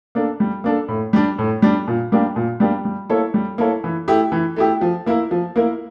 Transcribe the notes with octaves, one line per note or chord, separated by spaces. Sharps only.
A#3 D4 A4
G3
A#3 D4 A4
A2
G3 D4
A2
G3 D4
A#2
G3 A#3 D4 G4
A#2
G3 A#3 D4 G4
G3
A#3 E4 A4 C#5
G3
A#3 E4 A4 C#5
E3
A3 E4 G4
E3
A3 E4 G4
F3
A#3 E4 A#4
F3
A#3 E4 A#4